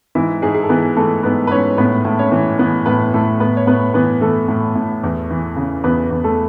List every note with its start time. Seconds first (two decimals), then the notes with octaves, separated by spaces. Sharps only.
0.15 G#2 E3 E4
0.42 G#2 G#3 G#4
0.54 G#4
0.63 A4
0.69 E3 B3 B4
0.97 E3 A3 A4
1.23 G#2 B3 B4
1.47 B4
1.51 G#2 C#4 C#5
1.77 A2 B3 B4
2.05 A2
2.19 C#4 C#5
2.32 E3
2.59 E3 B3 B4
2.86 A2 B3 B4
3.14 A2 A3 A4
3.40 A2 B3 B4
3.57 C#5
3.67 A2 B3 B4
3.94 E3 B3 B4
4.21 E3 A3 A4
4.48 A2
4.75 A2
5.03 E2
5.31 E3
5.56 C#3
5.84 E2 B3 B4
6.11 E2
6.24 A3 A4